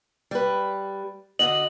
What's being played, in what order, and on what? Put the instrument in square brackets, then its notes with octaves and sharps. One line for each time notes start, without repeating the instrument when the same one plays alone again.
[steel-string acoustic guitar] G3 B4
[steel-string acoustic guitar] D3 F#4 D#5 [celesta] F#7